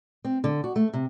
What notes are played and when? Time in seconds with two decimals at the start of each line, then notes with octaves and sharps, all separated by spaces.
0.24 C4
0.44 D3
0.64 F#4
0.76 A3
0.94 C3